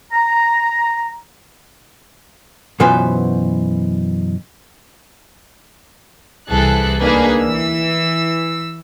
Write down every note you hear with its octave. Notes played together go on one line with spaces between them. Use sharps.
A#5
F#2 B2 E3 F4 B4 C5
C2 E3 G#4 A4 F#6
D2 A#3 D4 D#4 G#4 B4
E3 E6